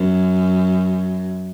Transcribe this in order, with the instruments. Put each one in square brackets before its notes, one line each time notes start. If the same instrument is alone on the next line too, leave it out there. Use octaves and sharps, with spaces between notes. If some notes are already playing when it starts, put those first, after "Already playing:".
Already playing: [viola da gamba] F#2